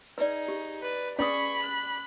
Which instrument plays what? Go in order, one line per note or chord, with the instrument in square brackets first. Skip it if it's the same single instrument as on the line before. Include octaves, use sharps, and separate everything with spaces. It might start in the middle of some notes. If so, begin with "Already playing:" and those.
[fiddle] D#4 G#4 [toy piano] B4 D5
[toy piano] G4
[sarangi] B4 [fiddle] D5
[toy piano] C#4 B4 D#6 [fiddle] G#4 C#6 [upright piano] D5 [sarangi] B5
[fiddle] F#6